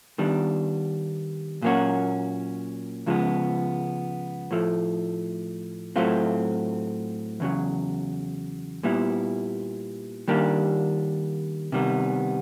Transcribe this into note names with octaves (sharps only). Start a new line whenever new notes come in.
D#3 G3 B3 D4
A#2 F#3 A#3 C#4 F#4
C#2 C#3 F3 G#3 B3
A2 F3 A3
A2 F#3 A3 C4 F4
E2 C#3 F#3
A#2 G3 B3 E4
D#3 G3 A#3 D4 G4
C3 D#3 G3 B3